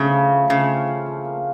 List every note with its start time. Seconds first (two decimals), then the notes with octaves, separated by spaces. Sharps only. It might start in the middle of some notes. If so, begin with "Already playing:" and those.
Already playing: C#3 A3 C4 F4
0.12 F3
0.32 A3
0.50 C#3 C4
0.69 F4
0.88 F3
1.06 F3
1.25 A#3